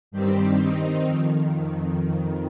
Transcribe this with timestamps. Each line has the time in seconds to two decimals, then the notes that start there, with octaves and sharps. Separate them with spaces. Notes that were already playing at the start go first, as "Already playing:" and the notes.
0.11 G2 D#3 G3 C4 G4
0.58 D#3 C4 D#4
1.04 F2 D#3